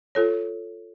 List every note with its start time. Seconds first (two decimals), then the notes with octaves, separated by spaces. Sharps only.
0.15 F4 A4 C#5